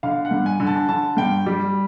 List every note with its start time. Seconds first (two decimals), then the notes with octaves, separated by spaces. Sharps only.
0.03 D3 F5
0.25 F#5
0.31 G2
0.46 G#5
0.60 D3
0.67 A5
0.88 D3 A5
1.17 G2 G5
1.46 G3